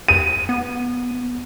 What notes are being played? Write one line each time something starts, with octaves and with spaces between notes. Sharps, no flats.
D#7
B3